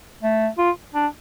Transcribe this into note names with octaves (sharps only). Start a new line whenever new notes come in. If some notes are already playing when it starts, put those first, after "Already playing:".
A3
F4
D4